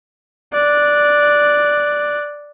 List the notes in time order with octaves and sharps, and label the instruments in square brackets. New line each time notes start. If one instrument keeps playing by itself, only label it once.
[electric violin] D5 F#6